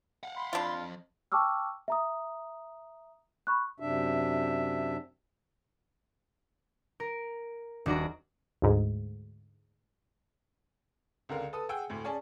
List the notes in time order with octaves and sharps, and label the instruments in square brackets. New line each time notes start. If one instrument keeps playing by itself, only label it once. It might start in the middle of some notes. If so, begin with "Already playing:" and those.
[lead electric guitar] F5 F#5
[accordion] B5 C6
[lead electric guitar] F2 [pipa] D4 F4
[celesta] G5 A5 C#6 D6 E6 F6
E5 A#5 D#6
B5 C#6 F#6
[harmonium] F#2 C3 D4 E5
[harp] A#4
D#1 D4 F#4 D5 A#5
[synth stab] D2 G#2
[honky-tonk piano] C#2 D3 A#4 F5
A4 B4 A5 D#6
G#4 F#5 G5 E6
D2 A2
C#4 G#4 D5 A5